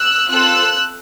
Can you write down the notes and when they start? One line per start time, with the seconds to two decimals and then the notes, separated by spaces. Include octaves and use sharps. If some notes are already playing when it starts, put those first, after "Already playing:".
Already playing: E6 F#6
0.30 C4 F4 A4 E6 F#6